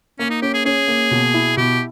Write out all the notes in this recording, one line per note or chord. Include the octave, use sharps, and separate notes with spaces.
A#3 C#4
D#4
C#4 G4
G#4
C#4 G#4
A#3
B2
E4
B2 G4